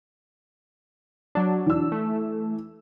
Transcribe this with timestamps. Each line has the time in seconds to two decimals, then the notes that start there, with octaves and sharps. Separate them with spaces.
1.35 F#3 D4
1.66 E3 E6
1.92 A3